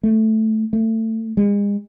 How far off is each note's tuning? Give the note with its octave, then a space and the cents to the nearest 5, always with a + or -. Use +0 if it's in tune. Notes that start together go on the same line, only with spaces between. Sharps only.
A3 -5
A3 +25
G#3 -40